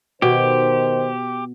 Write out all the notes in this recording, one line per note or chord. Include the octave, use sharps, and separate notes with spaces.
B2 D#3 G4 C5